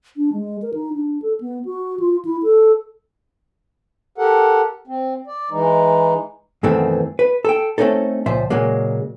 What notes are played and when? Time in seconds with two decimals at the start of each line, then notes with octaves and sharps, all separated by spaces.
0.17 D4
0.33 G#3
0.62 A#4
0.74 D#4
0.93 D4
1.22 A4
1.40 B3
1.65 F#4
2.00 F4
2.25 E4
2.43 A4
4.18 G4 A4 A#4 F#5
4.87 C4
5.27 D5
5.51 E3 G#3 D#4
6.63 F#2 B2 D#3 E3 A3 C4
7.19 B4
7.45 A4 G5
7.78 A3 C4 C#4 D#4 A4
8.26 C#2 A#2 F3 C5 E5
8.50 A#2 C#3 F#3 G#3 A#3